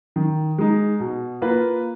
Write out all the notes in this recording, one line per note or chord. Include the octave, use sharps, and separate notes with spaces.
D#3
G#3 D#4
B2
A#3 F4 B4